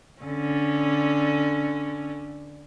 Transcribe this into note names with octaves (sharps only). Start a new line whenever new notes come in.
D3 C#4